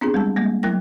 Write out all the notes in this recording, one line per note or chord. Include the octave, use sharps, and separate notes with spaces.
B3 C4 D4 F4 G4 G#4
G3 G#3 A5 E6
G3 G#3 A#3
F#3 A3 E4 A#4 G5 A#6